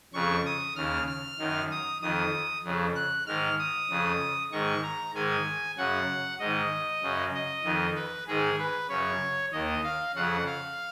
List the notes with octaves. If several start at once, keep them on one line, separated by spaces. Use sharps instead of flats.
F2 C#3 C#6
D#6
D#2 C#3 F6
F6
F#2 D#3
D#6
F2 D#3 D#6
F2 C#3
F#6
G#2 D#3 F6
D#6
F2 C#3
G#2 D#3 C#6
A#5
G#2 D#3 G#5
F#2 C#3 F#5
G#2 D#3 D#5
F#2 C#3
D#5
F2 D#3
B4
G#2 D#3 G#4
B4
F#2 C#3 C#5
D#2 D#3 D#5
F5
F2 C#3 F#5
F5